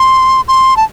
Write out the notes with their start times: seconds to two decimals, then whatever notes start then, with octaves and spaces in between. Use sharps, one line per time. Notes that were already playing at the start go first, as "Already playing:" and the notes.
Already playing: C6
0.48 C6
0.77 A5